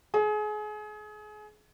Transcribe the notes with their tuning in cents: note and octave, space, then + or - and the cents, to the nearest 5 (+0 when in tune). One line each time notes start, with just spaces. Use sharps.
G#4 +30